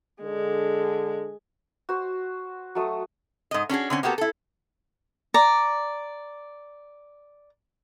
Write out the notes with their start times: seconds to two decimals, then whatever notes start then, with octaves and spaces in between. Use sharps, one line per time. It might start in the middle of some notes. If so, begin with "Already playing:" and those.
0.23 D3 G#3 A4
1.89 F#4 C5
2.75 F#3 A3 D#6
3.51 G#2 D#5
3.69 C#4 D4 F#4 G#4
3.90 D3 C4 C#4
4.03 A#3 B3 F#4 G4 A4
4.18 E4 A4
5.34 D5 A#5